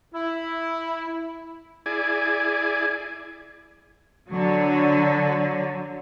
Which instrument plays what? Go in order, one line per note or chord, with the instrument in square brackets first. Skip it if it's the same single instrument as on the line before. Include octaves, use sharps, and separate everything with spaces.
[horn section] E4
[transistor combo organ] E4 G#4 D5 G#5
[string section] D3 F#3